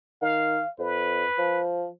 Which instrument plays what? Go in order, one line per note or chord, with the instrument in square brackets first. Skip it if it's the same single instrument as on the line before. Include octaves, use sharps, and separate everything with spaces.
[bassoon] D#3 [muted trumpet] F5
[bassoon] F2 [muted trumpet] B4
[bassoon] F3